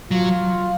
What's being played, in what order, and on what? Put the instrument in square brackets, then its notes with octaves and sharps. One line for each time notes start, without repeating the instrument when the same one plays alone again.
[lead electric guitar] F#3 [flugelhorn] F4